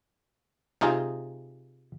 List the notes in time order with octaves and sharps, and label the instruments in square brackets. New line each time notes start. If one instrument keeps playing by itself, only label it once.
[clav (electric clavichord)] C3 D#4 F4 G#4